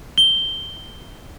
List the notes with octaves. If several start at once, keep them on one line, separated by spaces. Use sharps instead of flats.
G7